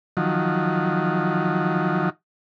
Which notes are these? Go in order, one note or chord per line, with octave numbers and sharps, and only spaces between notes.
D#3 F3 F#3